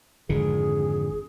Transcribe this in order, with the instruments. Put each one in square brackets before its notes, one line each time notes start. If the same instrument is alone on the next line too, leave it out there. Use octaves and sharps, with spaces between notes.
[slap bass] G#1 F2 D3 [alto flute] G#4